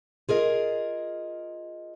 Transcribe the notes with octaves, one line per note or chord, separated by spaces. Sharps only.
F4 G#4 A#4 D#5